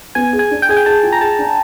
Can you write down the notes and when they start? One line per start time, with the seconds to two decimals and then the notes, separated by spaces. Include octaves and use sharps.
0.15 B3 G#5
0.33 G#4
0.39 G#5
0.51 D4
0.62 G5
0.69 G#4 G#5
0.77 G5
0.86 G#4 A5
1.03 F4
1.12 A#5
1.21 G#4 A5
1.39 D4